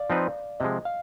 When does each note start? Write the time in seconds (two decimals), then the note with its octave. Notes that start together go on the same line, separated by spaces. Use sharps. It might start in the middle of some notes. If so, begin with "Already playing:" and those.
Already playing: D5 F5
0.10 F3 C4 D#4 B4
0.60 C3 F3 G#3 D#5
0.85 F5